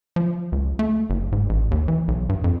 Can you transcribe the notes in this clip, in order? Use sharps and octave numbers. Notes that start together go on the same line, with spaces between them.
F3
C#2
A3
F#1
G#2
A1
D#2
E3
B1
G2
F2